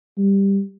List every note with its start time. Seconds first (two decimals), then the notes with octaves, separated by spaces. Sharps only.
0.17 G3